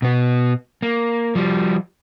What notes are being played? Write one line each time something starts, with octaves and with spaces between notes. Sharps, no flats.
B2 B3
A#3
F3 G3